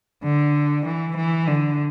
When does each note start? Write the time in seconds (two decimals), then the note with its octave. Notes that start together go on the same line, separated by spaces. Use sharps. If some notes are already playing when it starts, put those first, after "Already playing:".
0.23 D3
0.85 E3
1.16 E3
1.48 D3